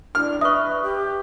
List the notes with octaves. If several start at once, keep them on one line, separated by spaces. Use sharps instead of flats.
D4 F6
B4 E5 C#6 D#6
G4